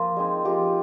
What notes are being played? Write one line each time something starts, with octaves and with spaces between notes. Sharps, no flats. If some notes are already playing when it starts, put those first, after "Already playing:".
Already playing: F3 A#3 F4
G#3 C4 D#4
F3 A#3 F4 G4